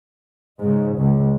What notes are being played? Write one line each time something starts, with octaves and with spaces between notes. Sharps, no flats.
G#2 C#3
C#2